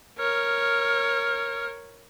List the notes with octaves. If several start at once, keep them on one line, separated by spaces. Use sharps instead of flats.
A#4 C#5 F6